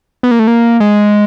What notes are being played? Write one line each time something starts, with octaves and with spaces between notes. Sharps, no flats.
B3
A#3
A3
A#3
G#3